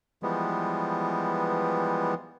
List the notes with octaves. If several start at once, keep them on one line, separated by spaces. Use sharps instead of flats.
E3 F3 G3 G#3 B3